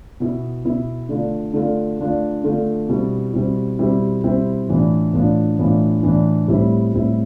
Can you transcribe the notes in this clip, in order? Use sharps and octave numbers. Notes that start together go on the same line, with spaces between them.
B2 B3 E4
B2 B3 E4
D3 A3 D4 F4
D3 A3 D4 F4
D3 A3 D4 F4
D3 A3 D4 F4
B2 G3 C4 E4
B2 G3 C4 E4
B2 G3 C4 E4
B2 G3 C4 E4
A2 E3 B3 D4 F4
A2 E3 B3 D4 F4
A2 E3 B3 D4 F4
A2 E3 B3 D4 F4
A2 G3 C4 E4
A2 G3 C4 E4